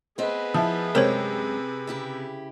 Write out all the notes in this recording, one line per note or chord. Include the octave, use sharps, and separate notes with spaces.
B3 C4 G#4 B4 D#5
F3 E4
F#2 C3 G#3 A#4 C5 C#5 G5
C#3 E4 G4